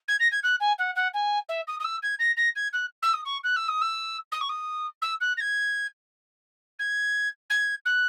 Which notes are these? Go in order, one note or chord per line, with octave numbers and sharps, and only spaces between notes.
G#6
A#6
G#6
F#6
G#5
F#5
F#5
G#5
E5
D#6
D#6
E6
G#6
A#6
A#6
G#6
F#6
E6
D#6
C#6
F#6
E6
D#6
E6
D#6
C#6
D#6
E6
F#6
A#6
G#6
G#6
G#6
F#6